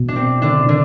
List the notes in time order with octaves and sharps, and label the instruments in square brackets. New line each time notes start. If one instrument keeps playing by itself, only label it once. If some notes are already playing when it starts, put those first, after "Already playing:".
Already playing: [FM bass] B2
[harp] D4
C4
D3 D4
D3 D4